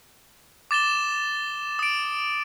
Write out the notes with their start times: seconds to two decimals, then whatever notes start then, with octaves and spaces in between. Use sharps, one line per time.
0.71 D6 A6 E7 G7
1.79 D#6 D7